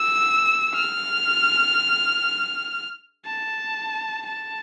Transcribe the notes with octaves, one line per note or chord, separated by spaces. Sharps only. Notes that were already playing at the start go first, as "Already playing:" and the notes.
Already playing: E6
F6
A5
A5